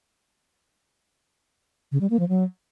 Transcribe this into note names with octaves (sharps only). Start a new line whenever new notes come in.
C#3
G3
A#3
F3
F#3